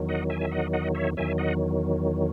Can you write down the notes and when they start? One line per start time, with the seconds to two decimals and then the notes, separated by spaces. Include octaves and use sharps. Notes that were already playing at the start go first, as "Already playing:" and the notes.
Already playing: E2 D#3 F#3
0.09 D#5 F#5
0.30 E5 G#5
0.41 E5
0.52 D#5 F#5
0.73 D#5 F#5
0.95 C#5 E5
1.17 E2 D#3 F#3 E5 G#5
1.38 D#5 F#5